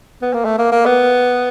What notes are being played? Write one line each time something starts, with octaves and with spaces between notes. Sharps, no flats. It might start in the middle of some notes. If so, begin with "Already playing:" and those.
B3
A#3
A3
A#3
A#3
B3